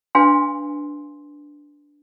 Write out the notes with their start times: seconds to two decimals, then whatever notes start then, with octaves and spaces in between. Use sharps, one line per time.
0.15 D4 B4 F5 G#5 C6